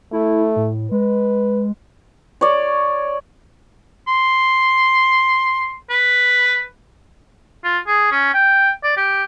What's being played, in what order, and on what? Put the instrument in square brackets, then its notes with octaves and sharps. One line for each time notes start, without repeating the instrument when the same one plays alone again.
[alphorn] A3 [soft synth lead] E4
[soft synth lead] A2
[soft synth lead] G#3 [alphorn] B4
[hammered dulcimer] C#5 D5
[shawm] C6
B4
[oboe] F4
G#4
C#4
G5
D5
G4